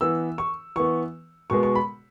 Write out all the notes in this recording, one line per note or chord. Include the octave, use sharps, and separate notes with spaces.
E3 B3 E6
C#6
E3 B3 C#6
B2 G#3 B3 C#6
C#6
B5